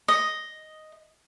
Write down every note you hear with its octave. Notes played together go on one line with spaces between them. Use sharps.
D#5